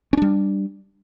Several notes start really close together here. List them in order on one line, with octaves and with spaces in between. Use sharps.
C#4 D4 G3